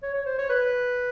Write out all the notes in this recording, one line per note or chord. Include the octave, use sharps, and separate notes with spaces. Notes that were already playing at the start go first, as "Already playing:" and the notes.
C#5
C#5
C5
C#5
B4